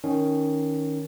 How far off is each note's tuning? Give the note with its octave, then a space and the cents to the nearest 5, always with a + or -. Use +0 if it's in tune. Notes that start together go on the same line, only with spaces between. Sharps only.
D#3 +0 C#4 +10